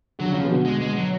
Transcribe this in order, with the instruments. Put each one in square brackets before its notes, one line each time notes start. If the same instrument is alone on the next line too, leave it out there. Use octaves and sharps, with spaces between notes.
[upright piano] D3 [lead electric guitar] F#3
[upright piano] C#3 [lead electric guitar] F3
[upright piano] B2 D3
[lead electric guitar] G#3
G#3
F#3